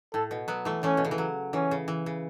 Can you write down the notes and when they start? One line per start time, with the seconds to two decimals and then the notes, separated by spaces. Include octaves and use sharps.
0.13 A2 A4
0.31 B2
0.48 F#3 B3
0.65 E3 A3
0.83 E3 A3 C#4
0.97 B2
1.05 C#3
1.11 E3
1.18 F#3
1.53 E3 C#4
1.71 C#3
1.88 E3
2.06 C#3